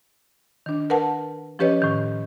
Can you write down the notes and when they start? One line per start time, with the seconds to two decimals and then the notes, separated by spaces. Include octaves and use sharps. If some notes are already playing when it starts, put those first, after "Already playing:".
0.66 D#3 D4
0.90 A#4 B4 F#5 A5
1.59 F3 C#4 G4 B4 C#5 D#5
1.82 A2 D#3